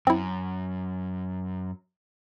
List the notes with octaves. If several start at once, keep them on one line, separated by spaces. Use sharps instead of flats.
F#2 C4 E4